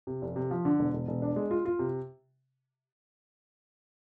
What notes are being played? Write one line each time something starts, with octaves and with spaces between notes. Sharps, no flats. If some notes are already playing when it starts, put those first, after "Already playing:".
C3
F1
C3
F3
D3
E1
E1
E1
D4
G#3
F4
F4
C3